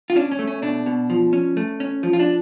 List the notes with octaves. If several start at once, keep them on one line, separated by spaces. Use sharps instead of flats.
F4
C#4 D4
C#4
A3
C#4
B2 D4
B2
F3
C#4
A3
C#4
F3
F4
D4